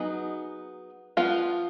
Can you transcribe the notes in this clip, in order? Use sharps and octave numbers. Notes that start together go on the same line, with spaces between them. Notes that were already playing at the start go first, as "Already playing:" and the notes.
Already playing: F#3 B3 D#4 G#4 D#5
F3 B3 F4